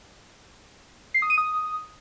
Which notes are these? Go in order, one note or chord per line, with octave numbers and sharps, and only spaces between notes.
C7
D#6
D#7
D#6